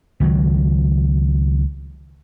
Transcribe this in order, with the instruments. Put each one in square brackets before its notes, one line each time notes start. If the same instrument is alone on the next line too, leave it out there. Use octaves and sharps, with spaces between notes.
[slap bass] C#2 D#3 F#3